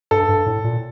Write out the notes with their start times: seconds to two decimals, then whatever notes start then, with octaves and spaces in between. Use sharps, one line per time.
0.11 G2 A4
0.29 G2
0.46 A2
0.64 A#2